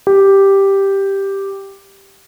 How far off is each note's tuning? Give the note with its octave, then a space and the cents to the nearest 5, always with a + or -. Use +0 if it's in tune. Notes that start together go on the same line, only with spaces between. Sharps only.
G4 +0